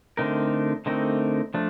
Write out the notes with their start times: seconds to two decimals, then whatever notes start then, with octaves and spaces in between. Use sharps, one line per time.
0.17 D3 A3 C4 D#4 A#4
0.86 D3 A3 C4 D#4 A#4
1.54 F3 A3 D4